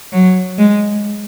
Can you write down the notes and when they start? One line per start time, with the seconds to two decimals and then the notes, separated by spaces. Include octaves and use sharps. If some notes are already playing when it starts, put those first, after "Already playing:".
0.13 F#3
0.58 G#3